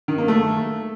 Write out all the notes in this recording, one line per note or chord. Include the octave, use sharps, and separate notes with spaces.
D#3
A#3
A3